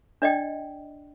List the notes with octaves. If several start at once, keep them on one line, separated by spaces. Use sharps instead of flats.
D4 D5 D#5 G5